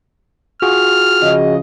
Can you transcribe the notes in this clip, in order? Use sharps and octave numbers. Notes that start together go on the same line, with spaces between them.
F4 F#4 G#4 F6
C#3 F3 D#5